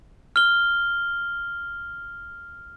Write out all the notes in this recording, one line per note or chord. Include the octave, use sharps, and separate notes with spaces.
F6 G7